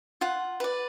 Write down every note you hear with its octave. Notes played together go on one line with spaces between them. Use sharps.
F4 F#5
B4 D5